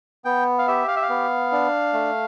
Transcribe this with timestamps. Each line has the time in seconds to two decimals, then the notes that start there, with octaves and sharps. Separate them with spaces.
0.25 B3 G5
0.58 F5
0.68 G4 E5
0.88 F5
0.96 E5
1.02 F5
1.09 B3
1.52 D4
1.93 A3